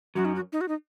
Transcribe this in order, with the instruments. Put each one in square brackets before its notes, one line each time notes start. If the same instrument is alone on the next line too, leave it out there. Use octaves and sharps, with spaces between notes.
[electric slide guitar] F#2 F#3 [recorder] F#4
[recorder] D#4
F#4
D#4
F#4
D#4